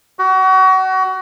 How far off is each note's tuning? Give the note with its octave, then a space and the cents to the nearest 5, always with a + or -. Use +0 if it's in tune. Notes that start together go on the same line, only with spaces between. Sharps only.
F#4 +30